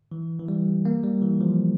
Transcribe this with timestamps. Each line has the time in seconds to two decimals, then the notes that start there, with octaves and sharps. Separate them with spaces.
0.12 E3
0.40 E3
0.48 G3
0.85 A#3
1.04 G3
1.22 E3
1.41 F3